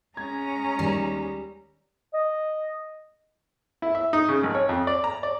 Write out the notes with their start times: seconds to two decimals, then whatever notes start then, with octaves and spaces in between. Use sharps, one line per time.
0.17 G#3 C#4 A#5 G#6
0.79 D#2 G3
2.14 D#5
3.82 E4
3.95 E5
4.13 D#4
4.29 C#3
4.43 G#1
4.55 C#5
4.69 F2
4.87 D5
5.04 A#5
5.23 D5